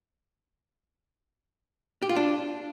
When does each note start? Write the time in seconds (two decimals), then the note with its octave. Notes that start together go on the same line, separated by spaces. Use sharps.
2.02 G4
2.09 F4
2.16 D4